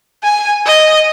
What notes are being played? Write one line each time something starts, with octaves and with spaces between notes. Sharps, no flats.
G#5
D#5